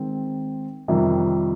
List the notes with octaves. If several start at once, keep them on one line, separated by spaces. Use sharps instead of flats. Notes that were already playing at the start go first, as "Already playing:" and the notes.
Already playing: D#3 G#3 C4
F2 C3 D#3 G3